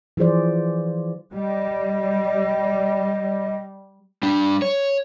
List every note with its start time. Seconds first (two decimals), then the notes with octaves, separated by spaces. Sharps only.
0.17 E3 F3 G#4 C5 D5
1.33 G3 D#5
4.23 G3 D4
4.62 C#5